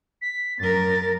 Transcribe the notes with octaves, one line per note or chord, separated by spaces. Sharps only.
B6
F#2 A#4 A6